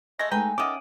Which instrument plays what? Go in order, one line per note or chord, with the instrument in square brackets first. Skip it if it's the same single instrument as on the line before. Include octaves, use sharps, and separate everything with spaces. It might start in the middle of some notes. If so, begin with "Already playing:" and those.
[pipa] G#3 A3 [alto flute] D#5 [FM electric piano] A#6
[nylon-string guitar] G#3 A3 D#4 [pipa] B4 G5 [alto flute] G#5 [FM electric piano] A#5 G6
[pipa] D#3 A4 [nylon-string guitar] C#4 E5 F#5 [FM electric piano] D6 D#6